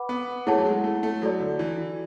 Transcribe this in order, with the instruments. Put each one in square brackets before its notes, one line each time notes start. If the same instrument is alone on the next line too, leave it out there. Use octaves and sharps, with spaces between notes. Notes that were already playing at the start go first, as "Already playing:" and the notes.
Already playing: [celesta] B4 F#5 B5 D6
[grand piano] B3
[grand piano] A3 [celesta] E4 G#4 C#5 F#5 A5
[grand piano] F#3
G#3
A3
A3
[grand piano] F#3 [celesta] F#4 A4 D5
[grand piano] D3
E3
E3